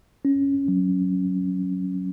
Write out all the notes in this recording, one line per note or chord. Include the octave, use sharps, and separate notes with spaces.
C#4
F#3